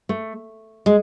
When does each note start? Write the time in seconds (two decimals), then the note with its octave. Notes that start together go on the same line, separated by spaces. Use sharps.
0.09 A3
0.86 G#3